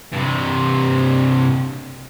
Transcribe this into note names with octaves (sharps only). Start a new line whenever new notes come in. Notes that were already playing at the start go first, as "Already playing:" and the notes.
G2 C3